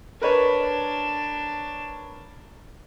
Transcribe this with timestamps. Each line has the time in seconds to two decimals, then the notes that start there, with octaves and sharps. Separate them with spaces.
0.22 D4 A#4 B4 C#5